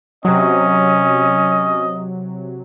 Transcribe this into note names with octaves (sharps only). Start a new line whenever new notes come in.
C3 F#3 C#4 D#5